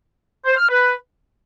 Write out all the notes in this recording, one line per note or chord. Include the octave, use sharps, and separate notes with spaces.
C5
F6
B4